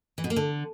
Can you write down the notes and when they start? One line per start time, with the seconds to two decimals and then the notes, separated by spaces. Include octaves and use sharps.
0.18 E3
0.24 B2
0.30 A#3
0.36 D3